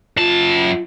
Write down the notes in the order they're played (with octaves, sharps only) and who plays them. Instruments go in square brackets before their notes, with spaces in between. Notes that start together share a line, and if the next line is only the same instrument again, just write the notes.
[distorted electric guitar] F#2 A5 [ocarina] F4